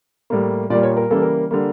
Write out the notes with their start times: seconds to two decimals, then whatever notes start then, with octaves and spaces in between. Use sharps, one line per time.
0.30 A2 G3 A#3
0.70 A#2 G3 A#3 D5
0.83 C#5
0.97 A#4
1.10 C#3 E3 G3 A#3 A4
1.22 A#4
1.51 D3 G3 A#3